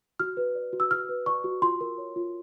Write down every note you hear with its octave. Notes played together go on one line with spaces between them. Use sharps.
F#4 F6
B4
D5
F#4
E6
F#4 F6
B4
D5 C#6
F#4
F4 C6
A#4
C#5
F4